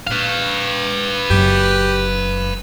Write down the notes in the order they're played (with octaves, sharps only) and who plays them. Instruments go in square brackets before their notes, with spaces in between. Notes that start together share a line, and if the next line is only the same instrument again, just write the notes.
[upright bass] A#2 [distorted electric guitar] B4 F5
[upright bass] F#1 F#2 [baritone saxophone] G4